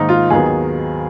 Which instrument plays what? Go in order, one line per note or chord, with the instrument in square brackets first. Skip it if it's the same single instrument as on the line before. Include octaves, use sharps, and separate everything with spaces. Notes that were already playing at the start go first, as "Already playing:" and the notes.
Already playing: [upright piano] G#2 D#3 A#3 D#4
F4
D#2 D#3 F#3 B3 G#4